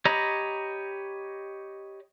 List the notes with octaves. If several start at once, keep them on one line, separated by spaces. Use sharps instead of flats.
G4 C#5 D#5 A#5 B5